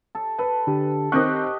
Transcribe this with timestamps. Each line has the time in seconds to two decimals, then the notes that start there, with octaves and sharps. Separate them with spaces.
0.15 A4
0.38 A4 B4
0.67 D3 D4 G4
1.12 D#3 C4 G4 D#5 C#6 F#6